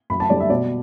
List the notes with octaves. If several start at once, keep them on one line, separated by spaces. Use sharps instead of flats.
F#2 B5
A5
D3 G3 D5
E5
B2 D5